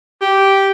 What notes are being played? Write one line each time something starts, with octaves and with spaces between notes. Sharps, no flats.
G4